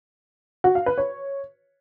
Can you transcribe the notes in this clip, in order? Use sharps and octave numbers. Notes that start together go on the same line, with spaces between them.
F#4
F5
B4
C#5